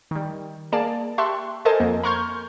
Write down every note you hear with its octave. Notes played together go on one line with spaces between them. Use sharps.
D#3 G3
A#3 G#4 D5 A5
G4 E5 A5 C6 C#6 F#6
A4 A#4 C5 D#5 G#5 A5
F2 A#3
A#5 C6 C#6 F6 G6 G#6